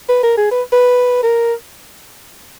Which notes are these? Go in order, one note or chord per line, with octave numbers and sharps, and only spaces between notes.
B4
A#4
G#4
B4
B4
A#4